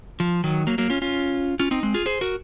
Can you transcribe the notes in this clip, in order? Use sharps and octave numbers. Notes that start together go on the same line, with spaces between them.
F3
D#3 F#3
F#3 A#3
F#3 A#3
C#4 F4
C#4 F4
C#4 F4
C4 D#4
G#3 C4
F4 G#4
G#4 C5
F#4 A#4